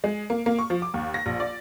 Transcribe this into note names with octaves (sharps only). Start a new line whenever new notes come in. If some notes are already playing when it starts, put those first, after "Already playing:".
G#3
A#3
A#3
C#6
F3
D6
D#2
A#6
A#1
D5